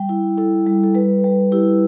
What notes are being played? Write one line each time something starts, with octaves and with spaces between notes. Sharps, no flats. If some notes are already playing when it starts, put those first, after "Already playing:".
Already playing: G3 G5
E4
E4 A4
G3
A4
G3 B4
G3
E4 G4